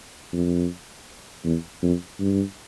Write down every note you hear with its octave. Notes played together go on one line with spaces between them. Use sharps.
F2
E2
F2
G2